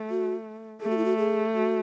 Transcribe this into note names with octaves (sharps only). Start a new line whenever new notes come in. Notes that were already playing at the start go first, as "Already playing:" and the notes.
Already playing: A3
F#4
A3 G#4
F#4
E4
F#4
G#4
F#4